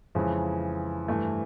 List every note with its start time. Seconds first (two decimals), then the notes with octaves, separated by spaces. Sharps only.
0.15 F2 C#3 E3 G#3
1.08 G2 E3 A3